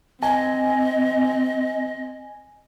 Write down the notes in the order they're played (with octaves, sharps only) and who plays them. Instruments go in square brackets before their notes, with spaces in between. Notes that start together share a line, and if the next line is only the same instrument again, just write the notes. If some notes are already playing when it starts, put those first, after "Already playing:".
[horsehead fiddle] C4 [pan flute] D#5 [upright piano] G#5